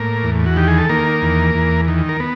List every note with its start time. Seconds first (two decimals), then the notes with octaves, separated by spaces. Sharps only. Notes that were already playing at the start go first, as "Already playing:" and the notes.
Already playing: A2 A#3 A#4
0.23 E2
0.46 F#4
0.56 D#3 G4
0.68 G#4
0.78 A4
0.89 D#3 A#3 A#4
1.22 E2
1.55 E2
1.88 D#3
2.09 A#4
2.20 B3